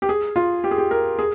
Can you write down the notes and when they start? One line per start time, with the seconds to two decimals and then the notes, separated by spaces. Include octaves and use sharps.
0.02 G4
0.09 G#4
0.36 F4
0.64 G4
0.71 G#4
0.78 G4
0.91 A#4
1.19 G#4